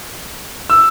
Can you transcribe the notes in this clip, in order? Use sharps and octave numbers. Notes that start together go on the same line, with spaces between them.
E6